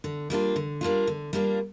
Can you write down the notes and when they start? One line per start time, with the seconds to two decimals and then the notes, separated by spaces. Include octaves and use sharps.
0.04 D3
0.30 G3 A#3 D4 F4
0.56 D3
0.81 G3 A#3 D4 F4
1.07 D3
1.33 G3 A#3 D4 F4